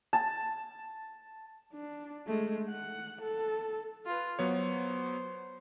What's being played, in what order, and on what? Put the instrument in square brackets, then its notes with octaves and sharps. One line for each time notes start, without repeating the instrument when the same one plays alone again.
[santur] A5
[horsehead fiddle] D4
G#3 A3
F#5
A4
[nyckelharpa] F4 B4
[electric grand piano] F#3 B3 C#5 [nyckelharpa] C5